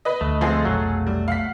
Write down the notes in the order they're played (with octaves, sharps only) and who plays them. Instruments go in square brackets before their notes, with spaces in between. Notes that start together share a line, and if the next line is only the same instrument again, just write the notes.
[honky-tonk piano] B4 D#5
[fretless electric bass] D2 [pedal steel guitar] A3
[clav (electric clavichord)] F3 G#3 C4 [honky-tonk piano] F4 G#4 A4
[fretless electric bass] F1 B1 [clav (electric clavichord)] F#3
[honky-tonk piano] G3
F5 F#5 B6